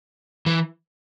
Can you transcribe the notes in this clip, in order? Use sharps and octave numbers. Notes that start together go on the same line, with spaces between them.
E3